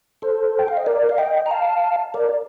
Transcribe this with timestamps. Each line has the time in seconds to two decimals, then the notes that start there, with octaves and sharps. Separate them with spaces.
0.22 A4 C5
0.59 G5
0.68 F5
0.77 D#5
0.86 A#4 D5
1.09 F5
1.18 D#5 G5
1.46 A#5
1.51 F5 A5
2.14 A#4 D5